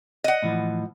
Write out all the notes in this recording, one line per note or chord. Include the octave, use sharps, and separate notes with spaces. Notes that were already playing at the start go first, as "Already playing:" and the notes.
D#5 F#5
A2 E3 F3